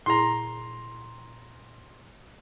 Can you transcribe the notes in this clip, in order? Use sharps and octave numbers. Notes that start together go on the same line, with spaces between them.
A#2 E4 G#4 A#5 C6